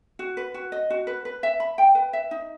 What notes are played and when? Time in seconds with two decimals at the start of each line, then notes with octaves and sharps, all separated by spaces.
0.19 F#4
0.37 B4
0.54 F#4
0.72 D#5
0.90 F#4
1.07 B4
1.25 B4
1.43 E5
1.60 B5
1.78 G5
1.95 B4
2.13 E5
2.31 D#4